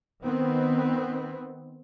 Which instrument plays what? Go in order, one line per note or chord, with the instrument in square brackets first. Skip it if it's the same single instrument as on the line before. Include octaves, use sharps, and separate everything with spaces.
[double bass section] D#3 B3 C4